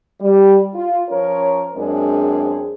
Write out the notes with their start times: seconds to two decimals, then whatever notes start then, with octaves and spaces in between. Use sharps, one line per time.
0.21 G3
0.74 F4
1.09 F3 C#4 A#4 C#5
1.75 F#2 G#3 C4 D4 G#4 A#4